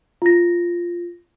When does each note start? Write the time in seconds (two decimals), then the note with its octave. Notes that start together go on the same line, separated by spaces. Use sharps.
0.22 F4 A#6